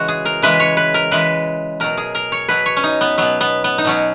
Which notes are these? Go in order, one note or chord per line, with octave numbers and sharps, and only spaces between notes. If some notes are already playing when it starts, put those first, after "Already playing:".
Already playing: C#3 E3 G#3 F#4
G#4
A#4
C#3 E3 G#3 B4
C#5
B4
A#4
C#3 E3 G#3 B4
B2 F#3 A#4
G#4
A#4
C#5
B2 F#3 B4
C#5
C#4
D#4
B3
B2 F#3 B3
B3
B3
D#4
B2 F#3 C#4